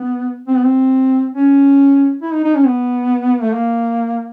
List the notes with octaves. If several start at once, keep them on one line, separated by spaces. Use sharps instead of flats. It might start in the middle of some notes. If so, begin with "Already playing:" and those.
Already playing: B3
C4
B3
C4
C#4
E4
D#4
D#4
C#4
B3
A3
A#3